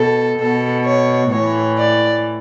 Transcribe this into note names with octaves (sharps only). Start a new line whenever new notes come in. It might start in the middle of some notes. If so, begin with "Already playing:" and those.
Already playing: B2 A4
B2 A4
C#5
A2 E3 C#5
D5